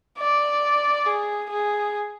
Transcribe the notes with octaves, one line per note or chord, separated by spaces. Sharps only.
D5
G#4
G#4